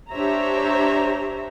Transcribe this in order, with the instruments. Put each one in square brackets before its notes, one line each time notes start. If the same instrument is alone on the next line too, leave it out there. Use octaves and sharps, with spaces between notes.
[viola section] D4 G4 C5 C#5 E5 A#5